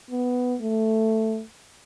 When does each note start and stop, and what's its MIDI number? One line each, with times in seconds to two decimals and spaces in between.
0.11 0.55 59
0.61 1.42 57